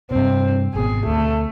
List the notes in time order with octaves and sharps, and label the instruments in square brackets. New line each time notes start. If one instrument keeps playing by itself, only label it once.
[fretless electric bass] G2 C3 [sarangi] C4
[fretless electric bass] G#1 B2 [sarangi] G#4
[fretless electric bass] D2 [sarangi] A3